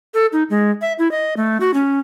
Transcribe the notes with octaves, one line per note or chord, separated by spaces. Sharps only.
A4
D#4
G#3
E5
E4
D#5
A3
F#4
C#4